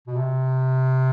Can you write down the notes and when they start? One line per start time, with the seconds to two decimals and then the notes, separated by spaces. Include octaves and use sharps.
0.07 B2
0.16 C3